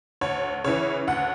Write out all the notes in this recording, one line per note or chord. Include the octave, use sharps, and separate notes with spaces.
D2 C#5
C#3 E3 C#5
D2 F#5